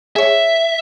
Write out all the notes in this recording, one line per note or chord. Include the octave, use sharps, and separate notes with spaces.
G#4 C#5 E5